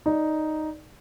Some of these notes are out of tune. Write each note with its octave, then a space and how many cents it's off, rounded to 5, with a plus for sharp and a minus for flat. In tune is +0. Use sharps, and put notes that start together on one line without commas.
D#4 +0 D5 +0